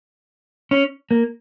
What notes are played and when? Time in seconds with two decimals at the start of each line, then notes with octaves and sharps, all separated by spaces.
0.71 C#4
1.11 A#3